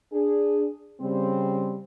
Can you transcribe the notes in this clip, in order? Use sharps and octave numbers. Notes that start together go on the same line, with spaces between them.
D4 G#4
C#3 G3 C4